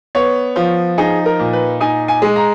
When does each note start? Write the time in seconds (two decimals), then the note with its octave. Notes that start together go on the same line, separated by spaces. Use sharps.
0.15 B3 C#5
0.56 F3
0.98 D#4 G#4
1.26 A#4
1.39 A#2
1.53 B4
1.80 D#4 G#5
2.08 G#5
2.22 G#3
2.36 A#5